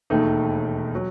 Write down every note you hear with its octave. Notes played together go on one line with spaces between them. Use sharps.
E1 D#2 D#3 A3 D#4
F#3